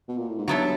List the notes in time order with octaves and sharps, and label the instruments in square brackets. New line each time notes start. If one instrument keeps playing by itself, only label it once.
[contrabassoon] B2
A#2
A2
G#2
[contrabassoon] G2 [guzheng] F#3 B3 E4 A4